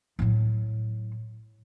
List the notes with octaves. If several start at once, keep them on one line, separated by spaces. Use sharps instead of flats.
A2 F#3